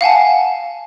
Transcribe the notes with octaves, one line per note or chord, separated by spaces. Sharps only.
F5 F#5 G#5 A5